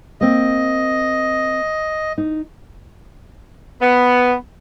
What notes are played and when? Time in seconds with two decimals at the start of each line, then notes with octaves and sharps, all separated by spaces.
0.21 A#3 C4 D#5
2.18 D#4
3.81 B3